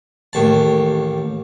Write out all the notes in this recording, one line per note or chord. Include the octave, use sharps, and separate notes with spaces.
A1 D#2 A5